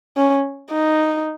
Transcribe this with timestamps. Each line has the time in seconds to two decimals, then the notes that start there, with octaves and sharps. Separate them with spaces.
0.17 C#4
0.72 D#4